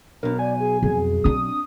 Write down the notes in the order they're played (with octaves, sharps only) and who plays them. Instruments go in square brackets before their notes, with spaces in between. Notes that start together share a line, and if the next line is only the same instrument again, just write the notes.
[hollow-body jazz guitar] B1 B2 [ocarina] D4 [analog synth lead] A#4
[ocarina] D5 [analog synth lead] G#5
[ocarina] G#4
[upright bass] F2 [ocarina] G#4
[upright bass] C4 D4 [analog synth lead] D#6